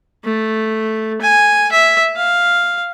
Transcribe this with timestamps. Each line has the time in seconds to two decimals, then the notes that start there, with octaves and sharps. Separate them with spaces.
0.24 A3
1.21 G#5
1.72 E5
2.16 F5